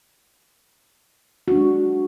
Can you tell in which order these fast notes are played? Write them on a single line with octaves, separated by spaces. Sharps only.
F#4 D4 G#3